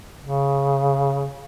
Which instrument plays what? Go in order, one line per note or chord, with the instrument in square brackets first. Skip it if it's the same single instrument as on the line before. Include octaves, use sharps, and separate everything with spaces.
[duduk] C#3